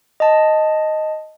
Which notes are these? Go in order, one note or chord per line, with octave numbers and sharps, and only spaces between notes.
D#5 A5